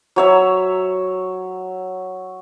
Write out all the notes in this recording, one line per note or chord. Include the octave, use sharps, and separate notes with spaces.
F#3 C#5 E5